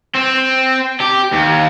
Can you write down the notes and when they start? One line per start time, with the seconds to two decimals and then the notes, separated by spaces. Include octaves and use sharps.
0.15 C4
1.00 G4
1.33 D#2